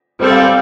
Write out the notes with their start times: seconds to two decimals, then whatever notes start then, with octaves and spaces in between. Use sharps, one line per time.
0.20 G3 C4 A4 C5 D5
0.30 F5
0.40 G5